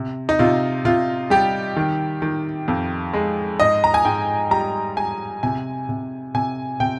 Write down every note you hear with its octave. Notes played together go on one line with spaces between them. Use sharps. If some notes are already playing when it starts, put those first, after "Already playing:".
Already playing: C3
D#4
C3 F4
C3 F4
G3 G4
D#3
D#3
F2
G#3
G#2 D#5
A#5
G#5
G#2 G5
G3 A#5
G3 G#5
C3 G#5
C3
C3 G#5
C3 G5